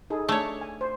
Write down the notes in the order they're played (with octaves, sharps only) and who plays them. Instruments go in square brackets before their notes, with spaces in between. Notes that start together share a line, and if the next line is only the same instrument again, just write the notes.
[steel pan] D#4 G#4 A4
[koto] A3 C#5 [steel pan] D4
[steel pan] G#5
C5